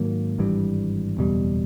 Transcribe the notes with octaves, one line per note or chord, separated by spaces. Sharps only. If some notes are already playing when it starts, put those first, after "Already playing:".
Already playing: G#2 D#3 F#3 A#3
G#1 G2 E3 G3
F#1 E2 B2 G3